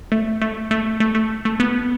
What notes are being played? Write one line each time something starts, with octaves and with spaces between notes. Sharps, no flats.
A3
A3
A3
A3
A3
A3
B3